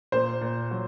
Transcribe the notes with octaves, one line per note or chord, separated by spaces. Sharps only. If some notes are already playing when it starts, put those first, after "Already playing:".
A#2 C5
A#2
F#3